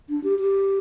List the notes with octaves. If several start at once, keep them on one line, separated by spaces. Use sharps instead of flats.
D4
G4
G4